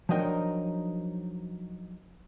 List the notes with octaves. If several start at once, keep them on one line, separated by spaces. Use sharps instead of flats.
F3 F#3 D4 D#4 A#4 G5